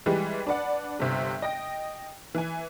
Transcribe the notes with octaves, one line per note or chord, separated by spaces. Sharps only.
E3 G3 G#3 G4 G#4
D4 B4 D5 F#5
G1 C3
D#5 G5 A#6
E3 G#5